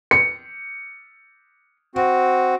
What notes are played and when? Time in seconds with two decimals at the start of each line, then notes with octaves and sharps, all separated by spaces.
0.11 C#7
1.95 C4 F#4